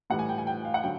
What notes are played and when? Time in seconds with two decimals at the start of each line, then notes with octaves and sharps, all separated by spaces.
0.10 A2 E3 G3 F#5
0.19 G#5
0.29 G5
0.38 G#5
0.47 G5
0.65 F5
0.74 F#5
0.83 D3 F#3 G5